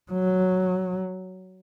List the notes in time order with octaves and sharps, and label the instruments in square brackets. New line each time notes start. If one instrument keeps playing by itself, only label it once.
[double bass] F#3